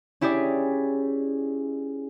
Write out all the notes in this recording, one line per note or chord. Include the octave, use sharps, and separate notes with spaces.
C#4 E4 G4 G#4 D5